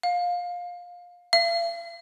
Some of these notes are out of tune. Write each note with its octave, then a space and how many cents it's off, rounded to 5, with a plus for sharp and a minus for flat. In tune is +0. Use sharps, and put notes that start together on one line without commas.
F5 +20
F5 -45